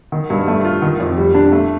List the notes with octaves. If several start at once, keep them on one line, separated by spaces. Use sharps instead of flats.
D#3
G2
A3
F4
D#3
F2
G3
D4
A3